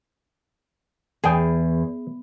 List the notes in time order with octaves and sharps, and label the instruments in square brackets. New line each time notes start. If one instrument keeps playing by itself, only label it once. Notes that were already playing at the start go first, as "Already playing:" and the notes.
[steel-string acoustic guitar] E2 [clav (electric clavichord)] G#4 G5